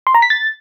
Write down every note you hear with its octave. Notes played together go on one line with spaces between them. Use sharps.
C6
A#5
B6
A6